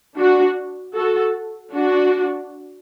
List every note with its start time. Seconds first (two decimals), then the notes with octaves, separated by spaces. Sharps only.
0.18 D4 F#4
0.95 F#4 A4
1.73 D4 F#4